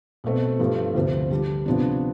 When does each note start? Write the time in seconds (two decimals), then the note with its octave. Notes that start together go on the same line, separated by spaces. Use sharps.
0.24 B1 B2 A3 C4
0.59 G2 F3 A3
0.95 D2 C3 F3 C4
1.30 D3 G3 D4
1.66 C3 F3 B3 D4